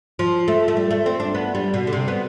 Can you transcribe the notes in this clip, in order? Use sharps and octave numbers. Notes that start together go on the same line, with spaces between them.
F3
A3
A3
G3
A3
C4
D4
B3
G3
B2
D3
C3
B3